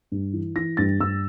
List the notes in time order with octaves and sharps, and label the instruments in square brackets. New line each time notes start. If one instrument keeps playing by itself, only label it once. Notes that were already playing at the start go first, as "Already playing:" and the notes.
[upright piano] G2
E3
E3 A#6
G2 A6
G2 E6